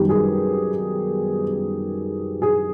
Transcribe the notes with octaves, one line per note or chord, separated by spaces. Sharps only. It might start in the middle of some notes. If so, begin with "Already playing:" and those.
Already playing: F#2 D#3 G3 B3 G4
G#4
G#4